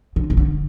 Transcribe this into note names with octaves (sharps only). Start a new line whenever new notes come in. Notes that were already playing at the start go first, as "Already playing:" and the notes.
D3
C3
D3